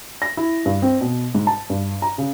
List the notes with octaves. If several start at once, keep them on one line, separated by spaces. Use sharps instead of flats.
A#6
E4
G2
C4
B2
G#2
A5
G2
A#5
C#3